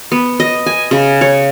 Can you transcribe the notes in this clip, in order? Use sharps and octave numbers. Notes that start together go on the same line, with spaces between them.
B3
D#5
G#5
C#3
C#5